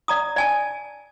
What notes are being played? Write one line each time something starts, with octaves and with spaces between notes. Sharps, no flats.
D5 A#5 D#6
D5 G#5 A5